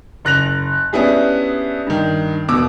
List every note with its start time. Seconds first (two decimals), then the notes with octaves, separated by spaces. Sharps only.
0.25 F#1 F#6 A#6 F7
0.93 B3 C#4 D4 E4 G4 G#4
1.87 G2 D#3
2.48 E1 B2 D6 E6